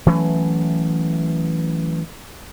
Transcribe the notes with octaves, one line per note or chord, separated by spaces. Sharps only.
E3 F#3 A3 C#4